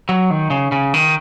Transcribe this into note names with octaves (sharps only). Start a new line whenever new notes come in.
F#3
D#3
C#3
C#3
D#3